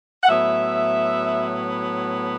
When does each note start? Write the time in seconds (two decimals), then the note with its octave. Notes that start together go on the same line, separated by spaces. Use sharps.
0.23 F#5
0.28 A2 F#3 B3 E5